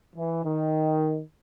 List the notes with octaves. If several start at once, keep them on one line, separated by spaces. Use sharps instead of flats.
E3
D#3